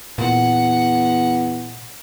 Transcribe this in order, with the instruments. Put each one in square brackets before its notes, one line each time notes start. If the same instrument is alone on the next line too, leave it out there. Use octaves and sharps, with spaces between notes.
[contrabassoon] E2 [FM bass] A#2 [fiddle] F#5